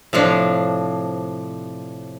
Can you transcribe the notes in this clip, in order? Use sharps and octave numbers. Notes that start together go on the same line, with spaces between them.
A2 C3 F3 D4